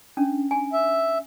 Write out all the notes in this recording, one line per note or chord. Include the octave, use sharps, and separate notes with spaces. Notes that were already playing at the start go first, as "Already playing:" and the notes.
C#4 D4
G#5
E5